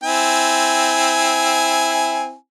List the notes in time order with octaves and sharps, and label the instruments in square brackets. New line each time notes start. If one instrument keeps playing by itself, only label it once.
[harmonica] C4 E4 G#5